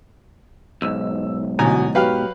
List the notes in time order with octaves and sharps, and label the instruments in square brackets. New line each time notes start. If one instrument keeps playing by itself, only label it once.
[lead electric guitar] B1 G#2 [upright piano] E6
[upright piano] A1 D2 B2 [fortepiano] G#5 A#5
[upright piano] F#3 G4 F6 [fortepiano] B4 F5